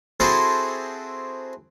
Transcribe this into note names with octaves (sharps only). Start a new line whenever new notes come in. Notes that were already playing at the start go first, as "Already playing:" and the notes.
C4 E4 F#4 G#4 A4 C5